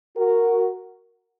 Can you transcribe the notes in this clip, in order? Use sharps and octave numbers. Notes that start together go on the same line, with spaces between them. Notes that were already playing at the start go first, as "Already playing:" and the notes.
F#4 A#4